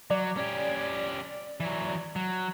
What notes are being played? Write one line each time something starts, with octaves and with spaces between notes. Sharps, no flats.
F#3 D5
C#4 G4
E3 F#3
F#3